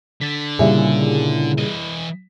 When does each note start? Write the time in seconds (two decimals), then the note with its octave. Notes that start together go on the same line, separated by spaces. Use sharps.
0.21 D3 A6 B6
0.59 A#2 C#3 G3 E4 G#4 E5
1.58 E3 D#5